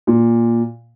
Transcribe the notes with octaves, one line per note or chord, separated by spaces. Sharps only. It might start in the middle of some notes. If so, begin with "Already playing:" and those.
A#2